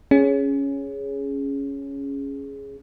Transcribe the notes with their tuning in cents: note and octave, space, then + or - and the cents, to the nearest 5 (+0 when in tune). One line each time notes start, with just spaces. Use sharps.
C#4 +0 G#4 +0